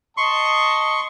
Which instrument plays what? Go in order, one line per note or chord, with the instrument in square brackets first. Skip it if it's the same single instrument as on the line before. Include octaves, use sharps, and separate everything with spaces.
[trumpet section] D#5 A5 [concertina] C6 C#6